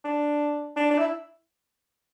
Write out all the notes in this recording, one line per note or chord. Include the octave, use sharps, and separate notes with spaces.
D4
D4
D4
E4